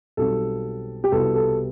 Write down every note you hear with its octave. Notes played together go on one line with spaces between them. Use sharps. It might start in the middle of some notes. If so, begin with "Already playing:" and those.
B1 B2 G3 C4 A4
G4
C2 B2 G3 B3 A4
A4